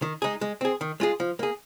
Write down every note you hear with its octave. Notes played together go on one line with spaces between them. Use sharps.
D#3
G#3 D#4 G#4
G#3
C4 G#4
D#3
G#3 F4 G#4
F3
A#3 G#4